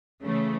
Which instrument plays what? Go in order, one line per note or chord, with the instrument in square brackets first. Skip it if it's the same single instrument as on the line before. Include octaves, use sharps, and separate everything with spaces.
[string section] C#3 E3 A3